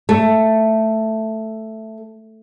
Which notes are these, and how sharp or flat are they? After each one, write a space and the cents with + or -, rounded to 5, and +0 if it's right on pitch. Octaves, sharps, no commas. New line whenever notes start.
A3 +5